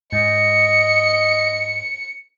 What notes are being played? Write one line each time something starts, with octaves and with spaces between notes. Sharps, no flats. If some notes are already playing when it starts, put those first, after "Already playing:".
G#2 D#5 C#7